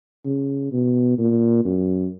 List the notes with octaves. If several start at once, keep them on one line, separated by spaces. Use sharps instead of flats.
C#3
B2
A#2
F#2